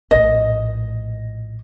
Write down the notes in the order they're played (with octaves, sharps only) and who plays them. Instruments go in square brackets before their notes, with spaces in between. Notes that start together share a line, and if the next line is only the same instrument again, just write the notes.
[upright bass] A#1 A2 [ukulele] D#5